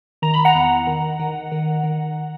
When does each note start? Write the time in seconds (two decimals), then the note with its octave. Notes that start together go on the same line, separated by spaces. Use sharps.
0.22 D#3 A#5
0.34 B5
0.45 F#5 A#5
0.55 E2
0.87 D#3
1.19 D#3
1.52 D#3
1.83 D#3